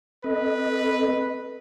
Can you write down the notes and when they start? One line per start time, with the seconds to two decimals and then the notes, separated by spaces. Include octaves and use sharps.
0.24 C4 A4 B4 D#5